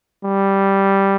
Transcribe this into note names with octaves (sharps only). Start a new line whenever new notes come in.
G3